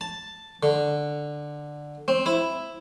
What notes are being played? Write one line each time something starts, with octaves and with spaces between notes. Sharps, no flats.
A5
D3
C4
E4